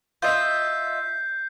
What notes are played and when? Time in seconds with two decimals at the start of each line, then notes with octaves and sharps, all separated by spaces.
0.22 F4 D#5 E5 G6 C7